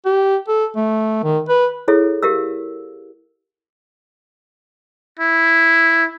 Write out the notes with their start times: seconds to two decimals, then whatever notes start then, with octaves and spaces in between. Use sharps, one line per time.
0.05 G4
0.48 A4
0.76 A3
1.23 D#3
1.49 B4
1.88 E4 G#4 A4 C#5 E5
2.23 G4 A#4 E5 F5 E6
5.19 E4